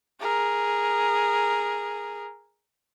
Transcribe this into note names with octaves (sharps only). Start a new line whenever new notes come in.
G#4 A#4